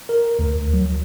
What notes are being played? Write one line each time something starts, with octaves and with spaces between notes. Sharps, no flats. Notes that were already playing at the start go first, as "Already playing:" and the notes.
A#4
D2
F#3